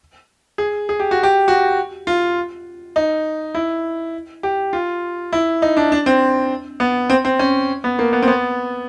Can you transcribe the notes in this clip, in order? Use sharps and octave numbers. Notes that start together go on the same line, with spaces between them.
G#4
G#4
G4
F#4
G4
F#4
F4
D#4
E4
G4
F4
E4
D#4
D4
D4
C4
B3
C4
C4
C#4
B3
A#3
B3
C4
B3